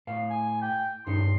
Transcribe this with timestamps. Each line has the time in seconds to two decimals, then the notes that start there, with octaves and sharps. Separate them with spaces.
0.07 A2 F5
0.30 G#5
0.62 G5
1.07 B1 G2 D#4 C6